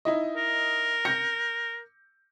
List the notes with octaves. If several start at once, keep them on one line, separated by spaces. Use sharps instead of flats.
D#4 E4 D#5
A#4
G6 A#6 C#7